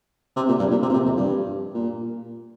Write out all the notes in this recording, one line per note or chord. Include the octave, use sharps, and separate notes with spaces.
C3
A#2
G2
A#2
C3
A#2
C3
F2
G2
A#2